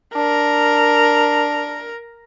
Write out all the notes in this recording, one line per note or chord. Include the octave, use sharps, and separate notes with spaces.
D4 A#4